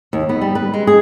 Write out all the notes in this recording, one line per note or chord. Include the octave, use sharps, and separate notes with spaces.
D#2
B3
G3
B4
G#3
G#4